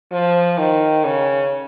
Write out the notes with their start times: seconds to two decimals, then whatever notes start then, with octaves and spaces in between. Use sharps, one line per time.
0.12 F3
0.58 D#3
1.05 C#3